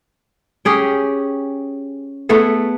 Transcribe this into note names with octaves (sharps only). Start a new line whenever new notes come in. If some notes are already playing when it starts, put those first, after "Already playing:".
C#4 G4 G#4 G5
A3 B3 E4 G#4